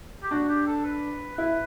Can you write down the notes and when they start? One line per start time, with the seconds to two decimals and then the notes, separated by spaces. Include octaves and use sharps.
0.23 G4
0.31 D4 F#4
0.49 G4
0.67 A4
0.85 B4
1.38 E4 B4